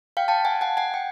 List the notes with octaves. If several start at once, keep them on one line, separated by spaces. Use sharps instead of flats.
F5 G5
G5 A5
F#5 G#5
F#5 G#5
F#5 G#5
G5